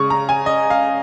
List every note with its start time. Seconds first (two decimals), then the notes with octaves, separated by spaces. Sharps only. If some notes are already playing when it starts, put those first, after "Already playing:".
Already playing: C#3 G#3 C#6
0.10 A#5
0.29 G#5
0.46 D#5
0.70 F5